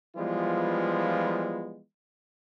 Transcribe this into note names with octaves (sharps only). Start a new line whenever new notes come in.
E3 F3 G3 G#3 B3 F4